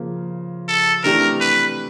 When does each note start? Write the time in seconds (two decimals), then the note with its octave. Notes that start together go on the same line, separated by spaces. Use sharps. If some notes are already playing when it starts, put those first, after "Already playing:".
Already playing: C#3 F3 A#3
0.68 A4
1.04 C3 E3 A3 D4 G4 A#4
1.41 B4